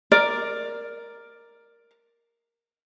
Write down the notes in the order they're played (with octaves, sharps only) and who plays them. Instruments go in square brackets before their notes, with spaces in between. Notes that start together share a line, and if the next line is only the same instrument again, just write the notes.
[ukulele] A#4 D5